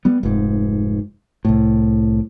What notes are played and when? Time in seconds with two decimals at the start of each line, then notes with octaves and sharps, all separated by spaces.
0.05 G3 B3
0.23 F1 G#2
1.45 C2 A2